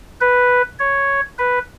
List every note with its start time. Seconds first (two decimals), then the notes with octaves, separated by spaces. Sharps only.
0.21 B4
0.79 C#5
1.39 B4